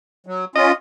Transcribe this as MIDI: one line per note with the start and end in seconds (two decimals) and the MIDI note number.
0.26 0.45 54
0.55 0.72 61
0.55 0.72 65
0.55 0.73 75